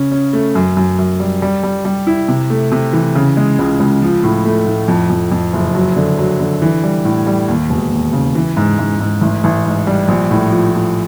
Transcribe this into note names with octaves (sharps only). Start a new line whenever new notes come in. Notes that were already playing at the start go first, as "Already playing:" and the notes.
Already playing: C#3 C#4
C#4
A3
F#2
F#2
F#2
G3
G3
G3
G3
E4
C3
A3
C3
E3
C#3
G#3
C#2
C#2
F3
A2
A3
A2
F2
F2
F2
F#1
F#3
D3
F#3
D3
E3
G3
A2
G3
D#2
E1
D#2
C#3
E3
G#2
G#2
G#2
A1
A1
G#2
G3
A#1
A2
F3
F3